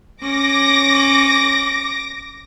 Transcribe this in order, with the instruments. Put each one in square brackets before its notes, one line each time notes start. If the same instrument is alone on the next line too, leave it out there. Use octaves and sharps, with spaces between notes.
[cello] C#4 [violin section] D6 A#6